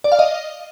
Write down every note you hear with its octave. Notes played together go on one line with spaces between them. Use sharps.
D5
F5
D#5